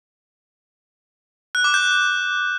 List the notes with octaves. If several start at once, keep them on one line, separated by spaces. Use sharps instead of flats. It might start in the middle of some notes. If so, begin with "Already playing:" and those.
F#6
D6
G6